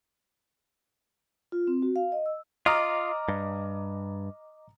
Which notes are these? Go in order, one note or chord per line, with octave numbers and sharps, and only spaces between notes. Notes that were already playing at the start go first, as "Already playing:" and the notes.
F4
C4
F#4
F5
D#5
E6
F4 D#5 A#5 D6 D#6 F6
G2